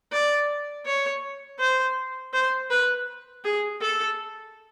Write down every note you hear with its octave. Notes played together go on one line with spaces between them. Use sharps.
D5
C#5
C5
C5
B4
G#4
A4